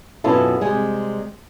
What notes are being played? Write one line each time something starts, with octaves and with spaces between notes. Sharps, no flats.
F#2 B2 C#4 E4 F4 A4
C3 G3 G#3 G#4